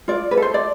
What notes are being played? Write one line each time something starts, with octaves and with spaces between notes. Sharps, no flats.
F4 D5
B4
A4
C5
D5